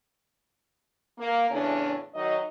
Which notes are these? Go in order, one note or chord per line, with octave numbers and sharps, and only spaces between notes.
A#3
E2 A2 C#3 C#4 D4
D#3 F#3 D#4 D#5